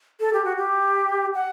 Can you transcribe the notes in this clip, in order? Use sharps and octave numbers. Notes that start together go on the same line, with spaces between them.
A4
G4
F#4
G4
F#5